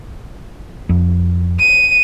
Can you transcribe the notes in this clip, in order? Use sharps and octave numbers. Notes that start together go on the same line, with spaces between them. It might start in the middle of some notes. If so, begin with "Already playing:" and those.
F2
D#7